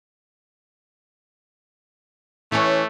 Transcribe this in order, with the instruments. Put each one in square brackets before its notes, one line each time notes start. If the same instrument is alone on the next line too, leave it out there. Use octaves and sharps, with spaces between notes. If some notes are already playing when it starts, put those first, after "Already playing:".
[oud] E3 C#4 [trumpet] A3